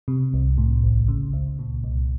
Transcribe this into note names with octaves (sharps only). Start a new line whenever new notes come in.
C3
C2
A2
A1
C#3
C#2
A#2
C2